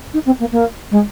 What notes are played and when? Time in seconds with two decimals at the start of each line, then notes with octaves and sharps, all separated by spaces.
0.13 D#4
0.26 C4
0.40 A#3
0.52 A#3
0.91 G#3